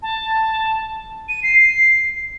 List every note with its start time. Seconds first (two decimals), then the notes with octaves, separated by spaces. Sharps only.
0.02 A5
1.29 D#7
1.43 C7